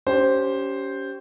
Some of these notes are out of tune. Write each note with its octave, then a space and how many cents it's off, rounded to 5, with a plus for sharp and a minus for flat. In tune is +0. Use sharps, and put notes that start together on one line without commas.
C#4 +25 G4 -15 C5 +0